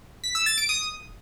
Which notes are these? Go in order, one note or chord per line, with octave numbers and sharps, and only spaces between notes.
B6
E6
A6
D7
D#6